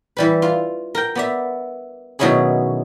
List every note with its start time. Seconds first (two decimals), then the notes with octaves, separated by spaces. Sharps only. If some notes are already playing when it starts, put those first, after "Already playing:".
0.17 E3 G3 B4
0.42 F4
0.95 A#4 G5
1.15 B3 D5 E5
2.19 B2 D#3 F#3 C#4 E4 G#4